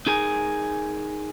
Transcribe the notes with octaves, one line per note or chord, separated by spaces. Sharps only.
D#4 G#4 A#4 G#5